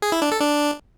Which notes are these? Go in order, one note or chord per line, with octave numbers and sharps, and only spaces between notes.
G#4
E4
D4
A4
D4